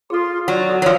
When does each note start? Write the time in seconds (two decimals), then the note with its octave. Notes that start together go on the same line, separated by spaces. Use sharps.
0.10 F4 G#4 A4 C6
0.48 F#3 D5
0.69 D#4 F#4 A4
0.82 F3 F#3 E4 C#5